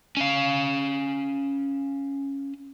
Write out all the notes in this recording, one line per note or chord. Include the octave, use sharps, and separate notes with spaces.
C#4 F5